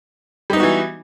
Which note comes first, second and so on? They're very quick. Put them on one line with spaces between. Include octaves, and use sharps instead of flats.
G3 D#4 B3 F#4 E3